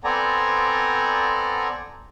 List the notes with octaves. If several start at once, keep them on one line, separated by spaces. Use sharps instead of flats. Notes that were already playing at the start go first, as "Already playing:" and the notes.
B3 C4 A4 D5 G#5 A#5